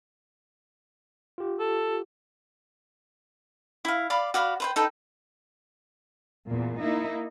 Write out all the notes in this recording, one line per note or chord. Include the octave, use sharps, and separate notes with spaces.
F4 G4
A4
E4 F5
D5 F5 B5 D6
F#4 D5 F5 B5
B4 C5 G5
D#4 A4 B4 G5
E2 A#2
A#3 D#4 E4